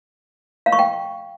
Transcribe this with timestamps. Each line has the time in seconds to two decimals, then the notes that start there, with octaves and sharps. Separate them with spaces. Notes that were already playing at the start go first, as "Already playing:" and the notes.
0.66 F5
0.72 C#6
0.79 G5